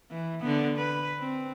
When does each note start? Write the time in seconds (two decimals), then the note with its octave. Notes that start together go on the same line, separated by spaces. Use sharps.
0.11 E3
0.41 D3 B3
0.78 B4
1.20 C4